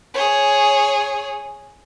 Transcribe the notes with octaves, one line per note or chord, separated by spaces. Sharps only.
G#4 C#5